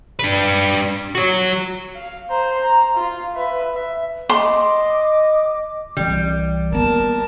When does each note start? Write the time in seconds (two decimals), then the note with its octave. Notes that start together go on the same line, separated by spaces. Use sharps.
0.19 D4 B4
1.15 F#4 C#5
1.95 F5
2.29 C5 A#5
2.63 A#5
2.95 F4
3.35 B4 E5
3.74 E5
4.29 D#5 C6 D6
5.97 C2 E3 G3
6.72 A#3 B3 A#4 A5